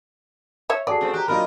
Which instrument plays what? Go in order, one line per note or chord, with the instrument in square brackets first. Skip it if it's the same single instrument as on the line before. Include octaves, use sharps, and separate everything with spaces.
[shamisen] C#5 E5
[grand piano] F#4 G#4 A4 [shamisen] D5 [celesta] A5 C7
[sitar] C#3 A3 C4
[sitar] G4 [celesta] A#5 F#6
[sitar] A#2 D#4 A#4 [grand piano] F#3 D4 F4 [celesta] B5 F6